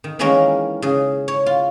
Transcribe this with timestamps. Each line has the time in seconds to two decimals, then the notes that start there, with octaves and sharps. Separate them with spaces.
0.04 D#3
0.19 D#3 E3 G#3 A#3 C#4 A#4
0.82 C#3 G#4 D#5
1.28 C#5
1.46 F4